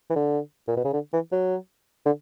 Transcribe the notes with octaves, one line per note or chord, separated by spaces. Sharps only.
E3
D3
A#2
B2
C#3
D3
E3
F#3
D3